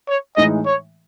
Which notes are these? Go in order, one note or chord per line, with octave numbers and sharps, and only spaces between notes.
C#5
A2 E3 G#3 D#4 D#5
C#5